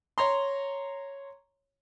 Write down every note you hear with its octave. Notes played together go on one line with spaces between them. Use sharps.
C#5 A#5 C6